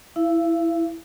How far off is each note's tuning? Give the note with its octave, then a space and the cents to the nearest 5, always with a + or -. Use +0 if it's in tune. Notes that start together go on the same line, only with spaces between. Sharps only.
E4 +0 F5 -45